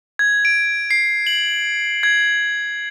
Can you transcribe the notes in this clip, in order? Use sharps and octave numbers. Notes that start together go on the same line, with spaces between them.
G#6
D7
C7
F#7
G#6